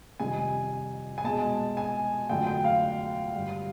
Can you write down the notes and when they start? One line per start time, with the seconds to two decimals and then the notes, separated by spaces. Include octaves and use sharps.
0.20 F2 C3 D#3 G3 G#5
1.18 G#5
1.24 B2 G#3 A5
1.77 G#5
2.29 F2 D3 F#3 A3 G5
2.47 G5
2.64 F5
3.34 G2 D3 G3